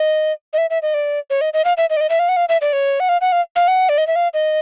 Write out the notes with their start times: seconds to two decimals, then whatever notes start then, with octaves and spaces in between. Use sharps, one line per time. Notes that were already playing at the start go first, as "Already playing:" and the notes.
Already playing: D#5
0.53 D#5
0.58 E5
0.70 E5
0.82 D#5
0.94 D5
1.30 C#5
1.41 D#5
1.53 D#5
1.65 F5
1.77 E5
1.90 D#5
1.97 D5
2.01 D#5
2.10 E5
2.19 F5
2.29 F#5
2.37 F5
2.49 E5
2.61 D5
2.73 C#5
3.00 F#5
3.09 F5
3.21 F#5
3.32 F5
3.56 F5
3.68 F#5
3.89 D5
3.98 D#5
4.07 E5
4.16 F5
4.34 D#5